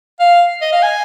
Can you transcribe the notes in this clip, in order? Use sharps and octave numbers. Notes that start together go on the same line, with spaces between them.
F5
D#5
F5
G#5